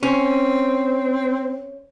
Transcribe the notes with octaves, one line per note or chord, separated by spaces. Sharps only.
C4 C#4